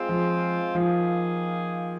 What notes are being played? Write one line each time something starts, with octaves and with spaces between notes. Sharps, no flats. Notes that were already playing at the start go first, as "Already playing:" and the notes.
Already playing: G#3 C4 F4 G#4
F3
D#3 F3 A#3 F4 G#4